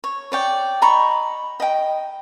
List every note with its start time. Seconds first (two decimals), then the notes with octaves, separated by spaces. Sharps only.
0.04 C#5
0.32 C#5 D5 G5
0.82 D#5 A#5 B5 C#6
1.60 D#5 G5